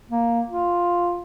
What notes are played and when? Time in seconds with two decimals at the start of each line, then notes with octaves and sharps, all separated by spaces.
0.10 A#3
0.48 F4